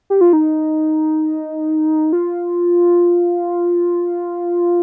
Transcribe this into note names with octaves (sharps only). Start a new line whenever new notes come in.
G4
F4
D#4
F4